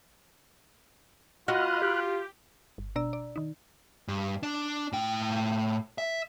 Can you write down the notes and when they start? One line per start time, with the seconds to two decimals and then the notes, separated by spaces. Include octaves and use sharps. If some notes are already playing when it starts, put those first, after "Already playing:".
1.48 F4 F#4 D#5 B5 F6 F#6
1.82 G4
2.78 G1
2.96 B2 D4 D5 A#5 E6
3.13 D5
3.36 D#3 D#4
4.08 G2
4.43 D4
4.93 A2 G5
5.98 E5